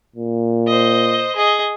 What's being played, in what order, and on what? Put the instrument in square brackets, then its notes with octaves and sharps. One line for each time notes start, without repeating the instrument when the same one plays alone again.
[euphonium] A#2
[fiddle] C5 D#5
G#4 D#5